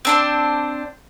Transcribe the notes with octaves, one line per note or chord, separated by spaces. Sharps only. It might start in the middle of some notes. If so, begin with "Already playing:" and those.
C4 D4 C5